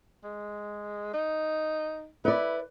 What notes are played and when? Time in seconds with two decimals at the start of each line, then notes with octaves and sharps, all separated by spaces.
0.24 G#3
1.14 D#4
2.25 E4 B4 D5